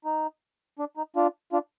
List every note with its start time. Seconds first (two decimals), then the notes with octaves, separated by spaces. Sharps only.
0.05 D#4
0.79 D4
0.97 D#4
1.16 D4 F4
1.52 D4 F4